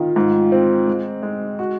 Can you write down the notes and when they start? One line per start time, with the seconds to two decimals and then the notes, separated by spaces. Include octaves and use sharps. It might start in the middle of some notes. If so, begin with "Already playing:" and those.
Already playing: D#3 F4
0.16 G#2
0.52 C4
0.87 G#3
1.23 G#3
1.59 F#4